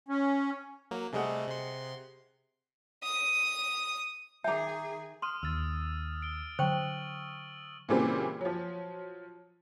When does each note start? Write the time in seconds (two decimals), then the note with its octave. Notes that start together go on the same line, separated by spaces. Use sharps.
0.09 C#4
0.91 F#3 A#3
1.13 C3 G3 A3 G#4 D#5 F#5
1.47 C3 C6
3.03 D#6 D#7
4.44 D#3 G#4 E5 G#5 A#5 D6 G6
5.22 C6 D#6 F6 D#7
5.43 D#2 E6 F6 A6
6.22 D7 G7
6.59 D3 F#3 C5 G5 C#6 D7 F#7
7.89 A#2 C#3 E3 G3 C4
8.41 F3 F#3